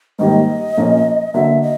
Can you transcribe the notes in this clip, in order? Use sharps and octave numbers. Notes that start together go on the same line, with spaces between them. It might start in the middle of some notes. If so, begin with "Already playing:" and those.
G#2 D#3 G3 A#3 D#5
A#2 F3 A#3 C#4
D3 F#3 A#3 D4 E5
D#5